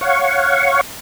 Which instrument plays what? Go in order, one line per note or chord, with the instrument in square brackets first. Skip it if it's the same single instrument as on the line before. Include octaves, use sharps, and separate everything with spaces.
[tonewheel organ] C#5 F5 F#5 C#6